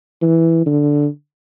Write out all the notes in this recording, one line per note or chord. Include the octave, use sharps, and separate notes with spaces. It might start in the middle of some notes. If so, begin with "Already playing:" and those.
E3
D3